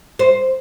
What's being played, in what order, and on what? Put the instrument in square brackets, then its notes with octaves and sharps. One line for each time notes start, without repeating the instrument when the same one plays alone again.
[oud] C5